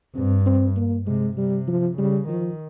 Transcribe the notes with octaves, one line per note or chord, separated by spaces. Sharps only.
G2 C4
C4
A#3
C3 G#3
C3 G3
F3
C#3 G3
D#3 F3